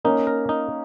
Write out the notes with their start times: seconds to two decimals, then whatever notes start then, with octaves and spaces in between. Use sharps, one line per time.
0.04 A#3 C#4 D#4
0.27 A#4
0.49 D#4